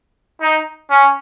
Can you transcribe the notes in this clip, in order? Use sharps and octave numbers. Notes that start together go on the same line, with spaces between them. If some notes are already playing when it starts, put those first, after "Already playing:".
D#4
C#4